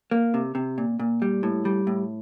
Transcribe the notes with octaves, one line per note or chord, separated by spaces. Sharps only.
A#3
C3
C3
A#2
A#2
G3
A2
G3
A2